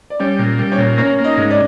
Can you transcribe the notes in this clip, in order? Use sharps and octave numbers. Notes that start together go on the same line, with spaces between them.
D5
G3 C#4 C#5
A#2
G3
C#4 C#5
A#2
A#3 C#4 C#5
A#3
D#4 D#5
G#2
D4 D5